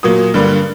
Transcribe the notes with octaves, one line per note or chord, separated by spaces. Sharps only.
A#2 F#3 A#3 D#6
G2 D3 G3 A#3